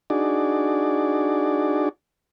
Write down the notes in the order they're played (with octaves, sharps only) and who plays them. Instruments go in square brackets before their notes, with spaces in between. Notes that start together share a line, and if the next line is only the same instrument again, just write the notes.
[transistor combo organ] D4 D#4 F#4 G#4 D5